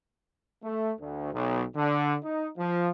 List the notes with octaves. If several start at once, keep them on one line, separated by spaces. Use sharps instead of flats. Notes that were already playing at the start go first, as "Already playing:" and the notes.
A3
D2
B1
D3
D#4
F3